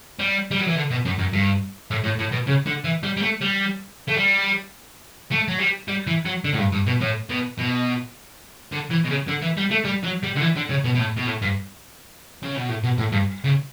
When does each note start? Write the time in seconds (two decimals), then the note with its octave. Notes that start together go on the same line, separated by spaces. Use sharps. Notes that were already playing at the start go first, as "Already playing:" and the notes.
0.19 G3
0.51 G3
0.60 F#3
0.67 E3
0.76 D3
0.91 B2
1.05 F#2
1.19 F#2
1.33 G2
1.91 A2
2.04 A2
2.19 A2
2.32 B2
2.47 C#3
2.66 D3
2.84 E3
3.04 G3
3.17 G3
3.23 A3
3.42 G3
4.08 A3
4.17 G3
5.31 A3
5.48 F#3
5.59 G3
5.88 G3
6.07 E3
6.25 F#3
6.44 D3
6.53 A2
6.59 G2
6.72 G2
6.87 B2
7.01 A2
7.29 B2
7.59 B2
8.72 D3
8.91 E3
9.05 B2
9.10 C#3
9.28 D3
9.42 E3
9.57 G3
9.71 A3
9.85 G3
10.04 F#3
10.24 G3
10.36 D3
10.41 E3
10.56 D3
10.70 C#3
10.84 B2
10.95 B2
10.99 A2
11.17 B2
11.27 A2
11.42 G2
12.43 C#3
12.57 B2
12.69 A2
12.83 B2
12.98 A2
13.12 G2
13.44 C#3